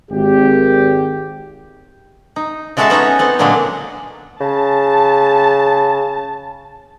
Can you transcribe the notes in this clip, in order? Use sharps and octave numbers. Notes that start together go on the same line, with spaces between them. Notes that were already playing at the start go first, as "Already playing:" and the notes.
G#1 G4
D#4
C#3 G#3 F#4 A4 E5 A5
B3 C#4 D#4 A4 C#5
B3 C4 A4
A#2 D3 F#3 G#3 A#3 D4
C#3 A5